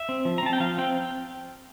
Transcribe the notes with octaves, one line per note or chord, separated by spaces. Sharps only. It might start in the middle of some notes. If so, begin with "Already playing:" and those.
Already playing: E5
C4
F3
A#5
C4 A5
G5
F3 F5
C4 G5